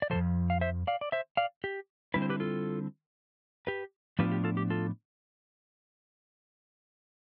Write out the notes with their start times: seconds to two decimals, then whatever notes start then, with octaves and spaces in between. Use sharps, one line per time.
0.02 D5
0.10 C3 F3 A4 C5
0.15 F2
0.50 F5
0.61 C5 E5
0.87 D5 F5
1.01 D5
1.12 C5 E5
1.37 D5 F5
1.64 G4
2.14 D3 G3 C4 E4 B4
2.22 C5
2.30 G4 B4
2.40 F4 A4
3.67 G4 B4
4.19 A2 F3 B3 D4 F4 G4 B4
4.32 G4
4.44 F4 A4
4.57 G4
4.70 F4 A4